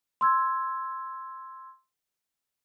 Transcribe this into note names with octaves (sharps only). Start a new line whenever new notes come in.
C6 E6 G#6